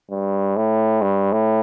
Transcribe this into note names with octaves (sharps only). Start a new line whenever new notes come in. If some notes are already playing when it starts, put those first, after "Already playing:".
G2
A2
G2
A2